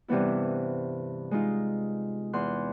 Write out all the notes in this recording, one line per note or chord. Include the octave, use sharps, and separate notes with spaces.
G2 C3 E3 B3 E4
G#3 D#4 F4
E2 C6 F#6